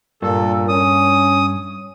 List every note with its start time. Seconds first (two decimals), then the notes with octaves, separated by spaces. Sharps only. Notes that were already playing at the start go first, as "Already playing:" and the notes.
0.22 G2 A#2 A4
0.69 C#4 D#6